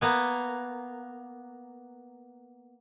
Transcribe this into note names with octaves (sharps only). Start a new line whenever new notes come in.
A#3 B3 G#5